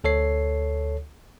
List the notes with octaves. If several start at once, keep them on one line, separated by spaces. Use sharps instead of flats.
D2 A4 C#5 C7